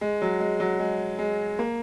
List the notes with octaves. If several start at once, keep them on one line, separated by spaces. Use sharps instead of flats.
G#3
F#3
G#3
F#3
G#3
G#3
A#3